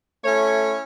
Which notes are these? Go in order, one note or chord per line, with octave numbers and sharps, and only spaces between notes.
A3 C#4 E4 C#5